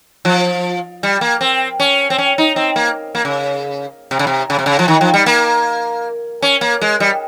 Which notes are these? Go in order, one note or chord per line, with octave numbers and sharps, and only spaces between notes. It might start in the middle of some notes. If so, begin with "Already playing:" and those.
F3
G3
A#3
C4
C#4
C4
C#4
D#4
C4
A#3
A#3
C#3
C3
C#3
C3
C#3
C3
C#3
F3
D#3
F3
G3
A#3
C#4
A#3
G#3
G3